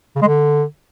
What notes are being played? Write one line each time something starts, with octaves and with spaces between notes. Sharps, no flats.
C#3
G#3
D3